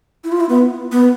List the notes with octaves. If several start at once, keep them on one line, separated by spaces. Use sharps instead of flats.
E4
F4
E4
B3
B3